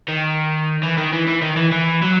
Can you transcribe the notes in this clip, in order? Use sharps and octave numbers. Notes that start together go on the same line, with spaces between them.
D#3
E3
D#3
E3
E3
D#3
E3
E3
F#3